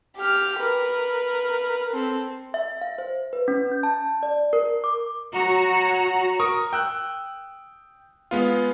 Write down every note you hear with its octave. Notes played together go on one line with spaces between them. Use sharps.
G4 F6
A#4 B4
C4 A4
E5
F5
C5
B4
C#4
G6
A5
D5
A#4
D6
F#3 F#4 A#5
A#4 C#6 D#6
G5 E6 F#6
G#3 B3 F4